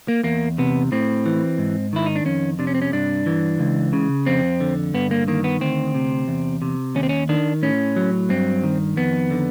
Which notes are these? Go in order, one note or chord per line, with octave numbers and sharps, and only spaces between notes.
A#3
E2 A#3
C3 B3
A2 C4
E3
G#2
D#3 E4
D#4
D4
F2 C#4
C3 D4
C#4
C4
C#4
G2 D4
E3
C#2
C#3
F2 C4
D3
G2 B3
A#3
D#3 A#3
B3
D2 C4
C3
E2
C3
D#2 C#4
C4
C#4
D#3 D4
A2 C#4
F#3
G2 C4
D#3
F2 B3
D3